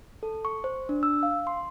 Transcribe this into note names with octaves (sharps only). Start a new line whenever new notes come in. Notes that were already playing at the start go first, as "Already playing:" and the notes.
A4
C#6
C5
D4
E6
F5
C6